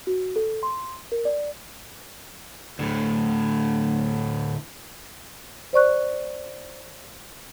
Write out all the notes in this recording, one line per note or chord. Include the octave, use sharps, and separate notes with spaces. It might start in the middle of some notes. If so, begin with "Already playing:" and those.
F#4
A4
C6
A#4
D5
D2 A2
C5 D5 C#6 F#6